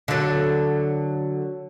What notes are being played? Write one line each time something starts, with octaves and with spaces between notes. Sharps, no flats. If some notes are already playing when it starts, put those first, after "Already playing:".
D3 F#3